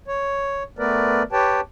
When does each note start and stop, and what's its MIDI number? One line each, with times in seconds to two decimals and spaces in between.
0.08 0.63 73
0.79 1.23 57
0.79 1.23 59
0.79 1.23 70
0.79 1.23 71
0.79 1.23 74
1.32 1.60 67
1.32 1.60 71
1.32 1.60 73
1.32 1.60 79
1.32 1.60 81